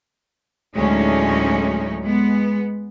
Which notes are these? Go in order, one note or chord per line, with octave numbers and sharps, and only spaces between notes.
D2 A2 F#3 G#3 C#4 D#4
G#3 B3